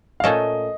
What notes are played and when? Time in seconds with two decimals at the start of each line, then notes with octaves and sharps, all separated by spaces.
0.20 F5
0.24 A#2 A3 C#4 A4 D#5